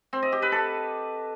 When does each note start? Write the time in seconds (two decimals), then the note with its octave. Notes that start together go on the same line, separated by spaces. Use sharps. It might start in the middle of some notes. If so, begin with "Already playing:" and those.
0.13 C4
0.23 D#5
0.32 G4
0.42 B4
0.52 A4